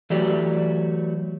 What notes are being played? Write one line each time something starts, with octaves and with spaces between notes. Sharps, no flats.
E3 F#3 A3 G4 D5